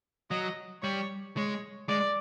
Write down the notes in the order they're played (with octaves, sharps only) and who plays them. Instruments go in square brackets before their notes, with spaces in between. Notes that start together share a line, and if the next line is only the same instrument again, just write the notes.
[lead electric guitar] F#3 [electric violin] D#5
[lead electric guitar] G3 [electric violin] C#5
[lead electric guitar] G#3 [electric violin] C#5
[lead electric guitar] G#3 [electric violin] D5